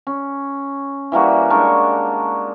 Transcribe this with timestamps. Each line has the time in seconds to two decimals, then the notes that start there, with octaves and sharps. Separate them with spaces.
0.07 C#4
1.12 E3 G3 A#3 F#4
1.50 G#3 D4 A#4 C#6